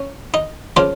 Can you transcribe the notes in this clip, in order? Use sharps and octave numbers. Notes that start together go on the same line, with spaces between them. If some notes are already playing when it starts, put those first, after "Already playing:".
Already playing: C#4
D#4
C#3 F3 A#3 F4